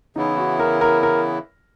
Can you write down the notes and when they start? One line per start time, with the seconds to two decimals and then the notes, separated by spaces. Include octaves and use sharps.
0.16 C#3 E3 B3 D#4 E4
0.38 F#4
0.59 A#4
0.81 A#4
1.03 A#4